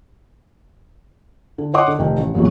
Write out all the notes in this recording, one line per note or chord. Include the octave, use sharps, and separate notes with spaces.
D3
C#5 D#5 F#5 C6 D6 D#6
D3
F1 D#3
A1
A1 E2 A#2 F#3